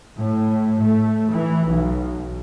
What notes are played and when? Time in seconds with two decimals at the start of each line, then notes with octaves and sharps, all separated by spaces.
0.16 A2
0.79 A3
1.30 E3
1.65 B1